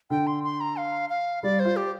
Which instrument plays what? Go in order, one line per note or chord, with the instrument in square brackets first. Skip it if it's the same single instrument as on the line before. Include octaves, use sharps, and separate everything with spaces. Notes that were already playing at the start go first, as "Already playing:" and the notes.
[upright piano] D3 [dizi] G5
[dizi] C6
C6
A#5
F5
F5
[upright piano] G3 [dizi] D5
[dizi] C5
[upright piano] F4
[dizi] G4